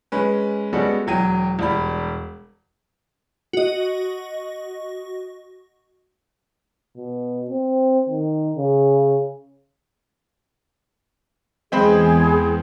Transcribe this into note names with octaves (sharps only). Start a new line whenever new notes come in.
G#3 C#4 B4
G3 G#3 B3 C#4 F#4 A4
E1 F#3 G5 D#7
E1 G3 B5
F#4 D#5
B2
C4
D#3
C#3
E2 G#3 C4 G#4 B5